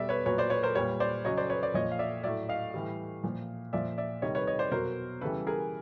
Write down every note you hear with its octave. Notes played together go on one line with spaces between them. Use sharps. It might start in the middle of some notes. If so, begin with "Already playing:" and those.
Already playing: B2 G3 D5 E5
B4 C#5
A#2 F#3 B4 C#5
C5 D5
B4 C#5
A#4 C5
A#2 G3 B4 C#5
C5 D5
C#3 F#3 C#5 D#5
C5 D5
B4 C#5
C5 D5
A#2 F3 C#5 D#5
F5
D5 E5
A2 F#3 D5 E5
D#5 F5
A2 E3 G3
A#2 F3
A#2 F3 D5 E5
D5 E5
C3 D#3 G3 C#5 D#5
B4 C#5
C#5 D#5
C5 D5
B2 F#3 A#4 C5
C#3 E3 G3 A4 B4
G#4 A#4